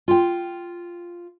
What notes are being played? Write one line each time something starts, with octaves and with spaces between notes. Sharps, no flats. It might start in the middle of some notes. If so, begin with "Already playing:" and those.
F4 G5